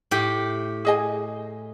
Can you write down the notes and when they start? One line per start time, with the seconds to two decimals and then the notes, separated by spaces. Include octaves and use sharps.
0.11 A2 G4 G5
0.85 G#4 D#5 G#5